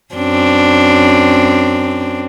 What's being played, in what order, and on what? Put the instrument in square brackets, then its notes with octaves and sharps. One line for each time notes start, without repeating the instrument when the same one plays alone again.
[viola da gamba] F#2 C4 D4